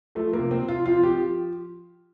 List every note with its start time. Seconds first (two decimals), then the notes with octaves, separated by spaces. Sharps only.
0.15 F3 A3
0.33 A#3
0.39 C3
0.51 C4
0.62 C3
0.68 F4
0.86 F3 F4
1.03 G4
1.10 F3